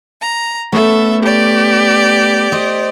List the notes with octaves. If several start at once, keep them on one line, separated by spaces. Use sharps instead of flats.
A#5
A3 B3 C#4 A4 E5
G4 D5
C5 D#5